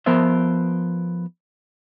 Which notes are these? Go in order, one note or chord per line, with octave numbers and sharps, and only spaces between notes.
F3 B3 A#4 C5 E5